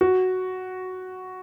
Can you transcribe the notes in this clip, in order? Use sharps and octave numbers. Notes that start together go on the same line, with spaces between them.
F#4